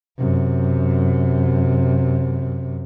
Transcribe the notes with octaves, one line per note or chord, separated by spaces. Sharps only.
F#2 C3